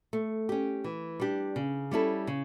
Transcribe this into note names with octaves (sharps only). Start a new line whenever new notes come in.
A3
C#4 G4
E3
G3 D4 G4
C#3
G3 C#4 E4 A4
C#3